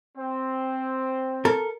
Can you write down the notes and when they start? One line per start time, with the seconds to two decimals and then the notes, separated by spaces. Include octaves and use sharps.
0.18 C4
1.45 A4 A#4